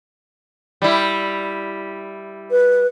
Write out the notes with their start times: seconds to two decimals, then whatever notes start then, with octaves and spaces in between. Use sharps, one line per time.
0.82 G3 E4
2.51 B4